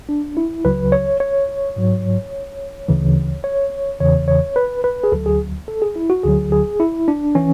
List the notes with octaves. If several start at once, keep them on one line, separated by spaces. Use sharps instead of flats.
D4
E4
C#2 C#3 F#3 B4
C#5
C#5
G#2 F#3
D2 C#3 E3
C#5
E2 C#3 E3 C#5
C#5
B4
B4
G#4
D2 D3 F#3 A4
G#4
A4
G#4
E4
F#4
D2 D3 F#3 G#4
G#4
E4
D4
E3 C#4